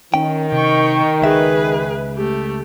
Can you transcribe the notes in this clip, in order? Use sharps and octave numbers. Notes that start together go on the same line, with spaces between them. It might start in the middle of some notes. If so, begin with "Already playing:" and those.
D#3 C#4 G5
C3 G5 C#6
C#2 G#4 B4 E5
A3 G4